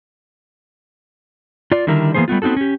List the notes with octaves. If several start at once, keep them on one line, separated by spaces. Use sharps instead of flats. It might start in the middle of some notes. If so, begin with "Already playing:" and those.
F4 D5
D3 D#3 G3 E4 A#4
E3 A#3 B3 G#4 C5
G3 A3 B3 F4
B3 C4 D#4 F#4 A4
C#4 G4